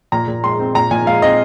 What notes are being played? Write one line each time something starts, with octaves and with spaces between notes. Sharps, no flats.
A#2 A#5
A#2
G#3 C6
C4
A#2 A#5
A#2 G#5
G#3 F5
C4 D#5